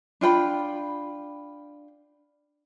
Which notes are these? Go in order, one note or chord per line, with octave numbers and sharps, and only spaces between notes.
D4 F4 G5 B5